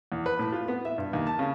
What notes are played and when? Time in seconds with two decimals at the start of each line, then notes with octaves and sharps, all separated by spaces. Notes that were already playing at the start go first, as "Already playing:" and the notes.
0.12 E2
0.26 B4
0.39 A2
0.52 F4
0.68 B3
0.85 E5
0.98 G2
1.13 D#2
1.27 A5
1.39 C#3